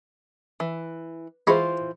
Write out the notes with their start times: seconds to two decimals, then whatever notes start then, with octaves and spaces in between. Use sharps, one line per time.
0.60 E3
1.47 E3 G#3 F4 C5 B5 C#6